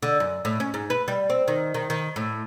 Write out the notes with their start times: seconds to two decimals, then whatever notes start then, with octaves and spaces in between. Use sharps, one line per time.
0.03 D3
0.20 F#2
0.45 A2
0.60 C#4
0.74 G#2
0.90 B4
1.08 G3
1.30 C4
1.48 D#3
1.74 D#3
1.90 D#3
2.16 A2